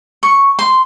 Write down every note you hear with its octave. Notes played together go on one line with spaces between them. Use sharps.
C#6
C6